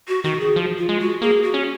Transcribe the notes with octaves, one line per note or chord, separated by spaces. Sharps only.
F#4
D#3 F#4
G#4
F3
F4
G#3
F#4
A#3 G#4
F#4
C#4